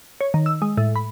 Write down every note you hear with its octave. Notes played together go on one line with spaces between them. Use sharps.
C#5
D#3
E6
G#3
A2
B5